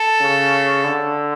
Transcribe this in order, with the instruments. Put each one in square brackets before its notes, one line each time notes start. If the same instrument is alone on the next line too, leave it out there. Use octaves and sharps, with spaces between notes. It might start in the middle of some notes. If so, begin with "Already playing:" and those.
Already playing: [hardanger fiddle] A4
[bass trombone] C#3
D3